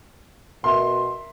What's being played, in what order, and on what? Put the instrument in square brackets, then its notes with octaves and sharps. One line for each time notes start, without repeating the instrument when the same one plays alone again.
[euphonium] B2 [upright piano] A#4 E5 [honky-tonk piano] C6